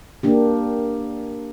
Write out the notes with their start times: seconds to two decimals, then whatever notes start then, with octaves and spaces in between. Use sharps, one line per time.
0.23 A#3 D4 G4